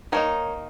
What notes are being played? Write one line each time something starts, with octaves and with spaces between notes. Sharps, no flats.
D#3 A#3 D#4 A#4 C#5